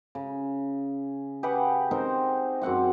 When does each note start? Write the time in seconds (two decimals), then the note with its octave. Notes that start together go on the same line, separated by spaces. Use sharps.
0.15 C#3
1.43 G4 G#4 B4 F#5
1.91 C4 D#4 A#4 C5
2.62 F#2 C4 F#5 D6